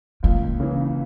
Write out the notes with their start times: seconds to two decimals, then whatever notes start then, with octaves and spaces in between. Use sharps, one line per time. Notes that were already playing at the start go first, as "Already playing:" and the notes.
0.23 C#2 A#3
0.60 C#3 E3